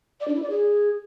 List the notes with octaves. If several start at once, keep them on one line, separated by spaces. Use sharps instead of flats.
D5
D4
E4
D5
G#4